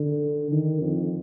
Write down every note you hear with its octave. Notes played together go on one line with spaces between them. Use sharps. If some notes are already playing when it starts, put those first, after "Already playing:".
Already playing: D3
D#3
F2